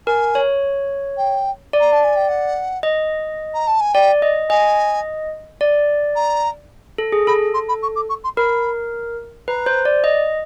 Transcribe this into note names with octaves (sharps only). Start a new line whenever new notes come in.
A#4 G#5
C#5
G5
D5
A#5
A5
G#5
G5
F#5
D#5
A#5
A5
G#5
D5 G5
D#5
D#5 G#5
D5
A#5
A4
G#4
A4 B5
C6
B5
C#6
D6
C#6
C6
A#4 B5
B4 A#5
C5
D5
D#5